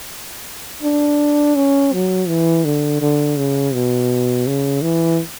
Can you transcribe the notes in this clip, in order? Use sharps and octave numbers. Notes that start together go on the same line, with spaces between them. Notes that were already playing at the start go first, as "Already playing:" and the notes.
D4
C#4
F#3
E3
D3
D3
C#3
B2
C#3
E3